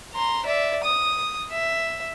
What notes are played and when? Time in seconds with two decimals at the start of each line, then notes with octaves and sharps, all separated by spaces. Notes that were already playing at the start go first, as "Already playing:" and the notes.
0.13 A#5 C6
0.46 D5 E5
0.83 D#6
1.52 E5